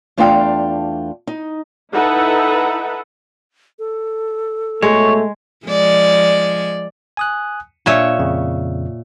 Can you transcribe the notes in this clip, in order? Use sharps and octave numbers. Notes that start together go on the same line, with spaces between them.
E2 A3 D4 F4 F5 G5
D#4
D#4 E4 A4 B4 E5 F#5
A4
B2 G#3 A3 C#5
F3 G#3 D5
G#5 D#6 F#6
A#2 D4 C#5 E5
F2 C#3